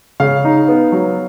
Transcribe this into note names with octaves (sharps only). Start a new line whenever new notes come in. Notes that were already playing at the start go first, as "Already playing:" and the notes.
C#3 F5
D#4
B3
F#3